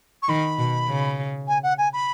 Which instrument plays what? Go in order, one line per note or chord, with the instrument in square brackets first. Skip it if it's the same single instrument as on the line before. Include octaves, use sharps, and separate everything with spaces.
[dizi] C#6
[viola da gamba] D#3 [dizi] B5
[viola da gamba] B2
C#3
[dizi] G#5
F#5
G#5
B5